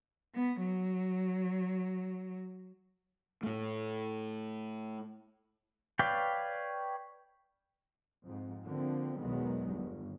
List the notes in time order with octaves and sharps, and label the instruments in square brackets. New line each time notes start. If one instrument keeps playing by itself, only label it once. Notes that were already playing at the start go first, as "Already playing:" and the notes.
[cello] B3
F#3
[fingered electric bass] A2 A3
[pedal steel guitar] B4 C#5 D5 F5 G5
[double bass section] F2 G#2
D3 F3 A#3 C4
B1 E2 D#3 F#3 G#3 B3
G1